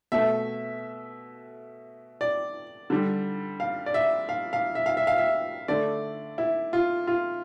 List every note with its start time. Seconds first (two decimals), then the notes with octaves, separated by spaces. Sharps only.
0.12 B2 A3 E5
2.21 D5
2.90 D3 G3
3.60 F5
3.86 D5
3.94 E5
4.29 F5
4.53 F5
4.75 E5
4.86 F5
4.97 E5
5.07 F5
5.18 E5
5.68 D3 A3 D5
6.38 E4
6.73 F4
7.07 F4